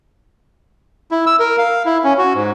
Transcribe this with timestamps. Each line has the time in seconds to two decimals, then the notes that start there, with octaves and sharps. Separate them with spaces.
1.11 E4
1.27 E6
1.40 A#4
1.58 F5
1.86 E4
2.04 C#4
2.18 F#4
2.34 G#2